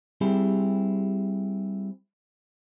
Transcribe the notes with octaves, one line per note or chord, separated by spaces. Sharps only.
G3 C4 E4 G4 G#4